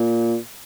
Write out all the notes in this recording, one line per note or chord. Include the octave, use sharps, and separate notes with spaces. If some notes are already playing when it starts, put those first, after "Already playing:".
Already playing: A#2